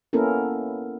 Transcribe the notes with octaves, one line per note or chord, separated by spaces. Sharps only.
A#3 B3 C#4 E4 A4 A#4